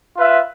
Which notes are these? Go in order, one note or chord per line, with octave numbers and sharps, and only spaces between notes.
F4 B4 E5